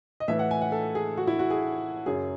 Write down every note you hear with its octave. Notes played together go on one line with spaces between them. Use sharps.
D#5
A2 E3 E5
F#5
G#5
F#5
A4
G#4
F#4
E4
F#4
G#4
F#2 C#3 F#3 G#4